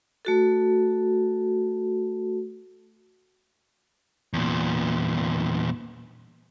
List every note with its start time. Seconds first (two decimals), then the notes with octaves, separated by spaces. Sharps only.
0.25 A3 F#4 A4
4.33 E2 A#2